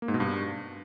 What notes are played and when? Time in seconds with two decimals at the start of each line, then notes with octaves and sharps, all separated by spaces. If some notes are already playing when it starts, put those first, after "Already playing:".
0.02 A#3
0.08 G#2
0.14 B2
0.20 G2